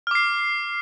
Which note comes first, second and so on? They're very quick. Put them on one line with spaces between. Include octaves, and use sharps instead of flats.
F6 D6 C7